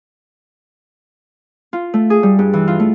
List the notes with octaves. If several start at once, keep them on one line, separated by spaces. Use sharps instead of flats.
F4
A3
G#4
G3
G2
E3
F4
A3